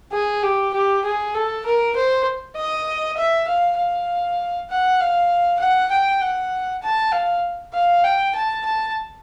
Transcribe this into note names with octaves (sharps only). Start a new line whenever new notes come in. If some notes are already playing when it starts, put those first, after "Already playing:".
G#4
G4
G4
G#4
A4
A#4
C5
D#5
E5
F5
F5
F#5
F5
F#5
G5
F#5
A5
F5
F5
G5
A5
A5